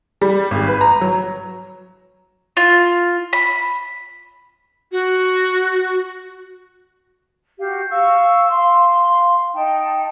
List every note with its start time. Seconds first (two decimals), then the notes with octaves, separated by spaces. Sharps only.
0.21 G3
0.51 G#1
0.68 B4
0.81 A#5
1.01 F#3
2.57 F4
3.33 B5
4.92 F#4
7.59 F#4 G4 F5
7.89 F5 C#6 E6
8.49 F5 C6
9.52 D#4 G5 A5